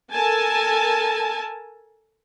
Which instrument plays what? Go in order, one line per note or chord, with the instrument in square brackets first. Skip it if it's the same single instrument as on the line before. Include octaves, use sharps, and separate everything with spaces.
[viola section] A4 A#4 G#5 A5